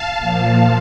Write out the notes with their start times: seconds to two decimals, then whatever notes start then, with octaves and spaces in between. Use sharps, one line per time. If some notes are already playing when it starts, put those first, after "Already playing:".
Already playing: F5 A5
0.19 A#2 F3